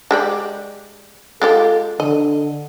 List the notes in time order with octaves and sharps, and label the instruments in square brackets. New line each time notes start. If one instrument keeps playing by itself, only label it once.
[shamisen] G#3 G4 D5
[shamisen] G#3 F4 G4 [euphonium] A4
[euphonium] D3 [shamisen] D#5